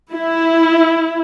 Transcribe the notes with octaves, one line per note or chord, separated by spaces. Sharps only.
E4